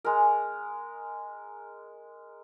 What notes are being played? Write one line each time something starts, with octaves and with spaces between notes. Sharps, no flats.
G#3 A#4